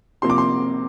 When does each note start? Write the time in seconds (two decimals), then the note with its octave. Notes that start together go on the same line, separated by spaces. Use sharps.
0.22 C3 F3 A#3 C6
0.30 D6
0.38 C6